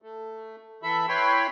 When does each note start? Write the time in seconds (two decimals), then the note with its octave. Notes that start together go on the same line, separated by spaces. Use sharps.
0.02 A3
0.83 E3 A4 E5 B5
1.08 E4 B4 C#5 G5 B5 C6